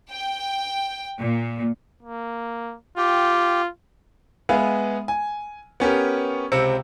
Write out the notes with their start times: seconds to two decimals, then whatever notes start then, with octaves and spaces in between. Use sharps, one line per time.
0.11 G5
1.19 A#2
2.02 A#3
2.98 F4 G4 G5
4.49 G#3 B3 G#4 B4 E5 F5
5.08 G#5
5.80 B3 C#4 G4 A#4
6.52 C#2 C3 C4 E6 C#7